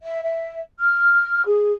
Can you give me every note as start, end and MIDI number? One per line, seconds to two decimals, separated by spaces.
0.03 0.21 76
0.23 0.60 76
0.79 1.43 89
1.46 1.73 68